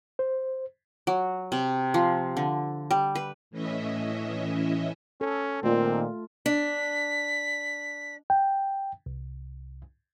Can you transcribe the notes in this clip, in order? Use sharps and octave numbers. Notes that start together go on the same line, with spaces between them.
C5
F#3
C3
F3
D3
G3
B4
A2 E3 C#4 D#5 E5
C#4 A4
A#2 D#3 A3 C4 F4
D4 B6
G5
C2